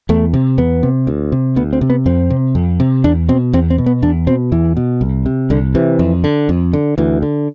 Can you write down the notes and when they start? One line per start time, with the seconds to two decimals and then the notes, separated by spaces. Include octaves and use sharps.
0.09 E2 A3
0.33 C3
0.58 E2 B3
0.83 C3
1.07 D2
1.32 C3
1.56 D2 B3
1.73 C4
1.81 C3
1.90 B3
2.06 F2 C4
2.30 C3
2.55 F2
2.80 C3
3.04 E2 D4
3.29 B2 C4
3.53 E2 C4
3.70 C4
3.78 B2
3.86 B3
4.02 E2 D4
4.27 B2 C4
4.52 E2 E3
4.77 B2
5.01 C2
5.26 C3
5.50 C2 D3
5.75 C3 E3
5.99 F2
6.24 D3
6.49 F2
6.73 D3
6.98 D2 E3
7.22 D3